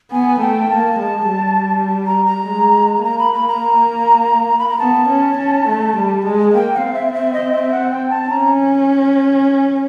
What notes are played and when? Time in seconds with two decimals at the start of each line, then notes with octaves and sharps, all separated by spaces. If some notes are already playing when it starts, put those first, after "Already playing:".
0.12 B3 G#5
0.41 A3 G5
0.70 A#3 A5
0.99 G#3
1.28 G3
2.06 A#5
2.26 A#5
2.45 G#3
3.04 A#3 A#5
3.19 B5
3.33 B5
3.48 A#5
4.59 B5
4.69 A#5
4.79 B3 A5
5.09 C#4
5.38 C#4
5.68 A3
5.96 G3
6.26 G#3
6.55 A#3 G5
6.74 F#5
6.78 F5
6.84 C4
6.94 E5
7.13 E5
7.33 D#5
7.52 E5
7.72 F#5
7.91 G5
8.10 A5
8.29 C#4 A#5